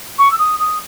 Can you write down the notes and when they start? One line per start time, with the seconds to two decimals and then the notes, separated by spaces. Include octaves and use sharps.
0.18 C#6
0.31 E6
0.38 D#6
0.59 D#6